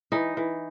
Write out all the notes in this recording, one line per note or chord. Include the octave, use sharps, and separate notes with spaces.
E3 D#4
E3